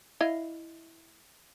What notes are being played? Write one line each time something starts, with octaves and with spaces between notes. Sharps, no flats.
E4 D#5 F5